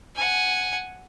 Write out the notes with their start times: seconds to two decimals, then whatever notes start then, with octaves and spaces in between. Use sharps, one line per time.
0.15 F#5 G#5